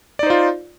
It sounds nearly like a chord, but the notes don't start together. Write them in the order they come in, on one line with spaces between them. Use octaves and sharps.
D5 D#4 C5 F4